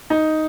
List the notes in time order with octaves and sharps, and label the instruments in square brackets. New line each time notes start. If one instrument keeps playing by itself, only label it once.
[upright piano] D#4